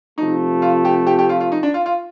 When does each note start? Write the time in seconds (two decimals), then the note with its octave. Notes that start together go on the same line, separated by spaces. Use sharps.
0.17 C3 F3 A3 D#4
0.62 F4
0.85 G4
1.07 G4
1.19 G4
1.29 F4
1.40 F4
1.52 D#4
1.63 D4
1.74 F4
1.86 F4